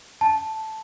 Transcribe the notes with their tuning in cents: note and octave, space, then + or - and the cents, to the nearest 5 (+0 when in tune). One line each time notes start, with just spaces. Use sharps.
A5 -5